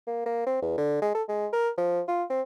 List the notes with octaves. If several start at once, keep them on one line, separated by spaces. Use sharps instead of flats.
A#3
A#3
C4
E2
D3
G#3
A4
G#3
A#4
F3
F4
C4